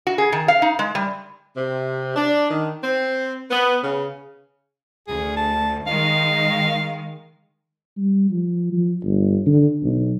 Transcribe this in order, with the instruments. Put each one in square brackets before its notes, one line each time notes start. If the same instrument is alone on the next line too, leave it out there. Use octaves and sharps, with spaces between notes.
[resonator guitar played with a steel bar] F#4
G#4
D#3
F5
D#4
G#3
G3
[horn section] C3
D4
D#3
C4
B3
C#3
[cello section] D2 [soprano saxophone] G#4
[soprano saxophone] A5
[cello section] D#3 G#3 [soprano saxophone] F5
[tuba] G3
F3
F3
G1
D3
B1